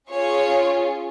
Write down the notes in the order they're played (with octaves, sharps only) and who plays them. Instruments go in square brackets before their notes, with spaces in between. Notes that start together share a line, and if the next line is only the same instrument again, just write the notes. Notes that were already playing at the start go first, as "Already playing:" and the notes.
[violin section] C#4 F4 G#4 C#5